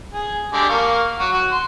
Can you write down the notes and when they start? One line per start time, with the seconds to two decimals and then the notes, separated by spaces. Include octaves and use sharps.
0.12 G#4
0.52 D3 G#3 G4
0.69 A#3 F5 C#6
1.19 F#3 F#4
1.32 F#4
1.51 C6